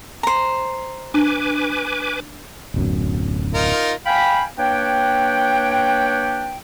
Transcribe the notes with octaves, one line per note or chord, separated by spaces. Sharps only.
C5 A#5
D4 B4 G#5 D6
D1 B1 F#2
D#4 F4 A#4
F5 G5 G#5 B5
A#3 D4 B4 C#5 G5